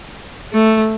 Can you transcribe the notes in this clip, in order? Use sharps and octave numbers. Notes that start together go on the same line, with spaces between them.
A3